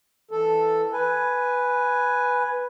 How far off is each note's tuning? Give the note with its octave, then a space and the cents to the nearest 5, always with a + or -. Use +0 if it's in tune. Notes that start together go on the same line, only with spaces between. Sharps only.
E3 +0 A4 +0
B4 +0 G#5 +0